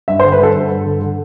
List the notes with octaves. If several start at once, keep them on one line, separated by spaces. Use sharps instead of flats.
G2 E5
C5
D3
B4
D3 A4
G2
G2
D3
D3